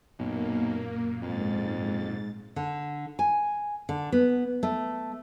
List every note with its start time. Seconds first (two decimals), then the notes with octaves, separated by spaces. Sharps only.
0.19 B1 F#2 A#2 A#3
1.22 F2 G#2 A6
2.56 D3
3.19 G#5
3.89 D3
4.12 B3
4.63 A3